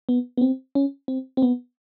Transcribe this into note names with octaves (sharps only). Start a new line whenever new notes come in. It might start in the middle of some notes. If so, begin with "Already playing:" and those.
B3
B3
C4
C#4
C4
C4
B3